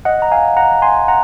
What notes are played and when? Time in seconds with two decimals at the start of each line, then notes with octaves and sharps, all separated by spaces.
0.05 D#5 F#5
0.22 A#5
0.32 F5 G#5
0.57 F#5 A#5
0.82 G#5 C6
1.08 F#5 A#5